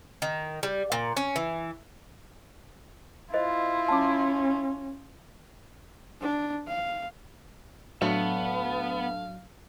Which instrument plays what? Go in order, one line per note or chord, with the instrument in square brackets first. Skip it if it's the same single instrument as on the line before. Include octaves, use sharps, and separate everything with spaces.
[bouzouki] D#3
G3
A#2
C#4
E3
[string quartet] E4 F4 [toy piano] C5 D#5
[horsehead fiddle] C#4 [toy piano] A5 D6
[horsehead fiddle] D4
F5
[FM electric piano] A2 F#3 D4 [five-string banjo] A3 [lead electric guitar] B3 [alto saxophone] F5